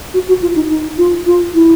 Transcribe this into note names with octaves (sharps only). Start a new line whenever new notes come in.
F#4
F#4
F4
D#4
D#4
F4
F4
E4